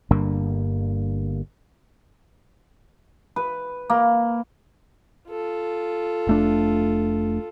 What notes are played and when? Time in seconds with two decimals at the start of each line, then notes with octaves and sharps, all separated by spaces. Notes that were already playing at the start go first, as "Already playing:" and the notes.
0.11 G1 G2 D3 A#3
3.36 B4
3.90 A#3
5.29 F4 A4
6.27 F1 A3 D4